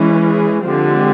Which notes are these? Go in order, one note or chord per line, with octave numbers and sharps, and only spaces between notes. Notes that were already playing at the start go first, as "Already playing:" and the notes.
Already playing: E3 G#3 C#4
G#4
D3 F3 G#3 C4 G4